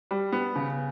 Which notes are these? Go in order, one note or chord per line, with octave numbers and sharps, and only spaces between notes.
G3
B3
C#3